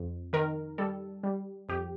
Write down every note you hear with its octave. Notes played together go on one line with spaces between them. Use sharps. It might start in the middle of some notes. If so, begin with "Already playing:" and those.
Already playing: F2
D#3 A#4
G3 A4
G3
F2 G4